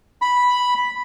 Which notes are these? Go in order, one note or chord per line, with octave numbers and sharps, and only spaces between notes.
B5